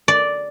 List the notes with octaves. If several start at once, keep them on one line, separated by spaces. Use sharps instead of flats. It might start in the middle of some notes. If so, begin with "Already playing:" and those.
D5